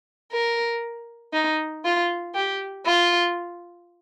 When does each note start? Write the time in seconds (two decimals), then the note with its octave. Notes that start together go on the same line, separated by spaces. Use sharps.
0.32 A#4
1.33 D#4
1.85 F4
2.35 G4
2.86 F4